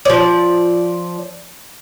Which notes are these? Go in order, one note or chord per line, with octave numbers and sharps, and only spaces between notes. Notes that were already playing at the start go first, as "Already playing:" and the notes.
F3 D5